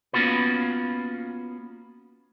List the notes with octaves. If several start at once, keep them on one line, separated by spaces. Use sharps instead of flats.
A#3 B3 C#4 F4 F#4 B4